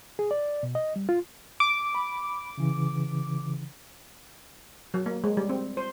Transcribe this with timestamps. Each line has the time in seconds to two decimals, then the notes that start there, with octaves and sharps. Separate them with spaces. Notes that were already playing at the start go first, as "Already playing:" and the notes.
0.19 G#4
0.31 D5
0.63 B2
0.75 D#5
0.96 G3
1.09 F4
1.60 D6
1.95 B5
2.58 C#3 E3
4.94 F#3
5.06 A#3
5.24 G#3
5.37 G3
5.49 C4
5.77 C5